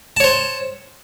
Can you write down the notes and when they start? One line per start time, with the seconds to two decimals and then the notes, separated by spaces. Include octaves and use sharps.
0.17 A5
0.20 C#5
0.24 C5